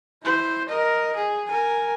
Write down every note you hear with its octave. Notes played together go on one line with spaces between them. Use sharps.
E4 C5
A#4 D#5
G#4
A#4 G#5